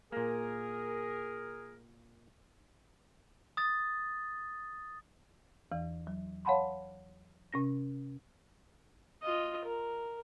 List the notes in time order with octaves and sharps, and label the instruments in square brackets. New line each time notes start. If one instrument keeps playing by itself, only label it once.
[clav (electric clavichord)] A#2 A#3 [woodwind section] G#4 A#4
[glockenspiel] D#6 A6
[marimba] E2 E3
F#3
C#5 F5 F#5 A5 B5 C6
C3 C#4 A#6
[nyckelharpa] F4 D#5
A#4